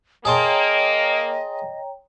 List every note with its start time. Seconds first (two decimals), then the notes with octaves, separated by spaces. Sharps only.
0.25 A#3 G#4 C#5 D#5 G5 A5 A#5 C6